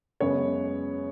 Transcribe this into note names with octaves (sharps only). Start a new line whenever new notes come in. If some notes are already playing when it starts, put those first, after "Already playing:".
F#2 C#3 G#3 B3 C#5